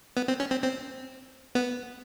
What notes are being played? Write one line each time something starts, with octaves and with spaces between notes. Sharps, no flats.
B3
C4
C#4
C4
C4
B3